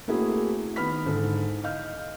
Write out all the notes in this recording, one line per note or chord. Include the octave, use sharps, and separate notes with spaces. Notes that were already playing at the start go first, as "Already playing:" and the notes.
A3 A#3 C4 E4 F#4 G#4
D#3 B3 B5 F6 B6
G#2 D3 E4 A4
D#5 F5 F6 G6